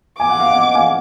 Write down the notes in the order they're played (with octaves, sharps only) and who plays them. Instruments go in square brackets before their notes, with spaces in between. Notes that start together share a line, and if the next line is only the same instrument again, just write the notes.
[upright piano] G#5 [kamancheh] D6
[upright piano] F#5
F5
D#5 F#5
F5 G#5